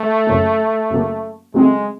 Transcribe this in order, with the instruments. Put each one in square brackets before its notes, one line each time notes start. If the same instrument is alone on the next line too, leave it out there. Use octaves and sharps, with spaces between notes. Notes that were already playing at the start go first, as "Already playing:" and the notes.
Already playing: [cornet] A3
[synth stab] F#2 C#3 F#3 A#3
F#2 C#3 F#3 A#3
[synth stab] C#3 F#3 A3 C4 [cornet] G#3